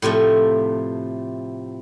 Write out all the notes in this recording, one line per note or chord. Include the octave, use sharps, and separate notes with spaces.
A2 C3 F3 A3